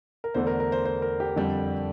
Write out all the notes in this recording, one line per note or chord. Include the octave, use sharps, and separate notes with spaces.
A#4
E2 D3 A3 D4 C5
A#4
A#4
C5
C5
A#4
G4
F2 D3 G3 D4